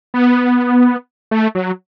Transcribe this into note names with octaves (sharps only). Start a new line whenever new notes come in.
B3
A3
F#3